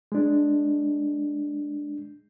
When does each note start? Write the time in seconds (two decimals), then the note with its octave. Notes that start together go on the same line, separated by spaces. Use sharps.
0.12 G#3 D4